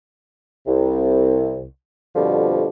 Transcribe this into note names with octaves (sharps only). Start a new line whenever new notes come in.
C2 C3
F2 B2 D3 F3 G3